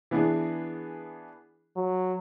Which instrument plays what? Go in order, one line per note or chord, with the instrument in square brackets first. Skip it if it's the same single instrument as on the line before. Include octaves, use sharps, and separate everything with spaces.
[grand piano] E3 B3 D4 G#4
[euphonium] F#3